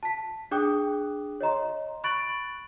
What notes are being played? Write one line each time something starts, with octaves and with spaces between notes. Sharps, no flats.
A5 B6
D4 G#4 G5 D6 D#6 F#6
C#5 D#5 A#5 C6
B5 C#6 F#6 A6 D7 F#7